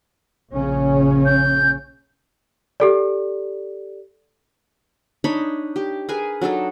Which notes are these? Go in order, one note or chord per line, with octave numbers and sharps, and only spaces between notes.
A#1 C#3 C#4
G6
G4 A4 D5
D4 D#4 C#5 B5
G4
G#4 A#4 B4 G#5
F#3 D4 D#4 A4